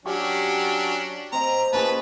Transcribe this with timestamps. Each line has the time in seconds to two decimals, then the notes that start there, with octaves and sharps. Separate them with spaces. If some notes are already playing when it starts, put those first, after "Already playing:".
0.05 F#3 C#4 D4 G4 C#6
1.32 C4 D#5 A#5
1.72 A#2 C#4 G#4 B4 A5